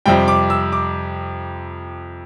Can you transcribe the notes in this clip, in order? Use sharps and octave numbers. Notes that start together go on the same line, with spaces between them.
F2 C3 G3 G5
D6
E6
D6